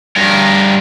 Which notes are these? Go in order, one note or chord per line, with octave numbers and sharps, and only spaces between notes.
G2 A#4